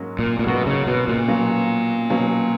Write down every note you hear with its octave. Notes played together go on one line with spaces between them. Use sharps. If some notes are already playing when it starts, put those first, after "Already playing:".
Already playing: G#2 F#3 A#3 C#4 F#4
A#2
A#2
G#2 B2 F#3 A#3 C#4 F#4
C#3
B2
A#2
B2 F#3 C#4 F4
B2 F#3 C#4 F4